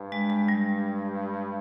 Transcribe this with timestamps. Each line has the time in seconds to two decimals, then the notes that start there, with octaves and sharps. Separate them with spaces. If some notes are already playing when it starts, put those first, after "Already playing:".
Already playing: G2
0.12 G#3
0.30 G#3
0.48 G3